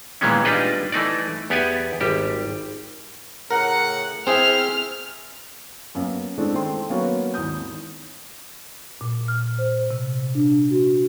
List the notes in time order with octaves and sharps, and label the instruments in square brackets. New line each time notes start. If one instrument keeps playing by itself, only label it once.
[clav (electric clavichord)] A#2 D#3 E3 G#3 B3 C#4
G3 D4 D#4 F4 B4 D#5
E3 A3 D#4 D5
E2 B3 G4 D5 F#5 G#5
G#1 G3 G4
[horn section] A2 C#3 F#5 [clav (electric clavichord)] A#4
[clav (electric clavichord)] C4 G#4 [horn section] E4 C5 E5 [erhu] F6
[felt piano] F#2 A#3 B3
E3 G#3 A3 C4 D4
D#3 A3 C5 G5 C6
F#3 A#3 B3 C#4 F#4
G#1 D#2 E3 D#6 G6
[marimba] A#2
F6
C5
C3
D4
F#4